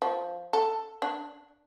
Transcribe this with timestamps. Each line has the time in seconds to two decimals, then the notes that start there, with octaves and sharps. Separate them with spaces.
0.02 F3
0.53 A4
1.02 D4